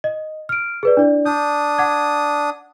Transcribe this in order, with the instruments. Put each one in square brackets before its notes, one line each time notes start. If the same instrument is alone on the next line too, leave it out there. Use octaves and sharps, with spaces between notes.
[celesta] D#5
F6 D7
G#4 B4 D5
D4 E4 D5
[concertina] D4 D#6 [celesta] G6
[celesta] F#5 D6 G#6